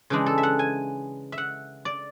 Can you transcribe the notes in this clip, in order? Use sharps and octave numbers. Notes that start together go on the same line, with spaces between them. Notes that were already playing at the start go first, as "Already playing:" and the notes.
C#3 E3 G#3 D4
A4
E5
F#5
G#5
E5
F#5
D5